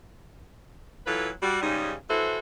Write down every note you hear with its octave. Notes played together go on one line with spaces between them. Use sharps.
E3 F#3 F4 A4 B4
G3 F#4
G#2 C#3 G3 D#4
E3 E4 F#4 A4 C5